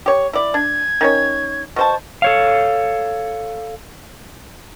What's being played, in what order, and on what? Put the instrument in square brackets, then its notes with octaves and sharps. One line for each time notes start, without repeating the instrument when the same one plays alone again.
[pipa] G4 C#5
E4 D5
[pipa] D4 [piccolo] G#6
[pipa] D#3 C#4 C#5
[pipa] B2 C5 A5 [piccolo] C#6
[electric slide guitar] A4 C#5 F5